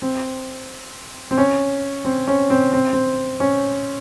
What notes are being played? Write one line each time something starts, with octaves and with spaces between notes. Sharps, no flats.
C4
C4
C#4
C4
C#4
C4
C4
C4
C#4